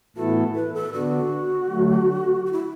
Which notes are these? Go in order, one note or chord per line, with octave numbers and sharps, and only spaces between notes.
A2 E3 B3 E4 F#4 A4
B4
A4
D3 B3 D4 F#4
D3 F#3 A3
F#4
E4